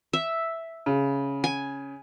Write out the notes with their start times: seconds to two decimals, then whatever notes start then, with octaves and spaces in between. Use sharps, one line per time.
0.13 E5
0.86 C#3
1.44 G#5